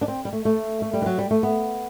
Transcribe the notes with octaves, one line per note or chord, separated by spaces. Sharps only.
D4
C4
G3
A3
A3
A3
G3
E3
F#3
G3
A3
B3